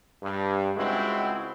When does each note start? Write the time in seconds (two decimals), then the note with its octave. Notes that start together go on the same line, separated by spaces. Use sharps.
0.23 G2
0.77 C#2 G#3 C4 E4 F#4